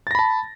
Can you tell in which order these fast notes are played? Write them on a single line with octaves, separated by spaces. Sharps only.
A6 A#6 B5 A5